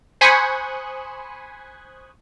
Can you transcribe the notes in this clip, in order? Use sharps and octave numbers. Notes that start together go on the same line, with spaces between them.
C5 G#5 B5 C#6 D#6 F#6